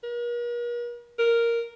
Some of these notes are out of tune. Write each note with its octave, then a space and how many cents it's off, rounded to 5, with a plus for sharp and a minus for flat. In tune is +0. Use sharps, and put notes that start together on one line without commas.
A#4 +45
A#4 +0